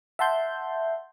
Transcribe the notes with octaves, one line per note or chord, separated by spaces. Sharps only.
E5 F#5 A5 C6 G6